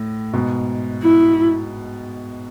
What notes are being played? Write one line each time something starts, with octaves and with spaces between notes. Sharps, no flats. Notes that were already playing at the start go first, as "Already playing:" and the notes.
Already playing: A2
G#2 B2
E4